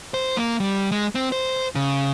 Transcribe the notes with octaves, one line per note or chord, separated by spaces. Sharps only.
C5
A#3
G3
G#3
C4
C5
C#3